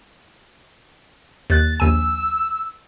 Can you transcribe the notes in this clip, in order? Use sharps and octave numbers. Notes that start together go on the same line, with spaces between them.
D#2 F#6 A6
A#1 D#2 G#5 E6